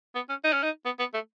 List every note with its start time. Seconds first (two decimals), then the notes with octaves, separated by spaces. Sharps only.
0.15 B3
0.29 C#4
0.44 D#4
0.53 C#4
0.63 D#4
0.85 B3
0.99 B3
1.14 A3